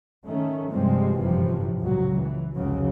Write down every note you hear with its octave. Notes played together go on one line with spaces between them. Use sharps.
D#3 A3 C#4
G2 C3 F3 G3 G#3 C4
G1 F#2 A2 C3 E3 F3
C#2 A#2 F#3
E3
F1 C#2 C#3 F#3